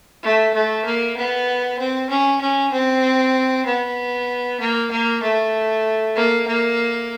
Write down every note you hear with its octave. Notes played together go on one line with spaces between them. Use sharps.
A3
A3
A#3
B3
C4
C#4
C#4
C4
B3
A#3
A#3
A3
A#3
A#3